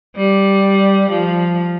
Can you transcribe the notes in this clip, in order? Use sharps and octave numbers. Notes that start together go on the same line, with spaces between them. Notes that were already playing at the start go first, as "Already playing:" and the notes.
G3
F3